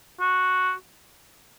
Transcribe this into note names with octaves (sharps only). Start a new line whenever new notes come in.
F#4